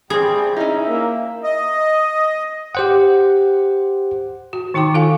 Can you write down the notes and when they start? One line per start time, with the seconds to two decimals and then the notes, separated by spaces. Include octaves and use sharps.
0.10 A2 G3 C4 E4 G#4 G5
0.57 C#4 D#4 E4 E5
0.88 A#3
1.44 D#5
2.75 G4 C5 F#5
4.53 F#4
4.74 D#3 D#4 G5 A#5 D6
4.94 D#3 F4 A4 F5 G#5